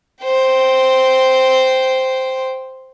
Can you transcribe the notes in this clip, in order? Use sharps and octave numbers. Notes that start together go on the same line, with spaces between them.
C5 G5